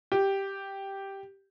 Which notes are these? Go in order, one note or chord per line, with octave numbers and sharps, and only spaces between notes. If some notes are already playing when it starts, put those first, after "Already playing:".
G4